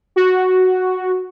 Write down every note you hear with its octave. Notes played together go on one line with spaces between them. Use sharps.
F#4